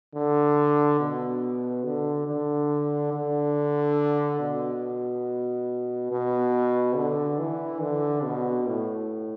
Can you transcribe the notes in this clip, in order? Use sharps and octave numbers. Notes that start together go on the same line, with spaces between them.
D3
B2
D3
D3
D3
B2
B2
D3
E3
D3
B2
A2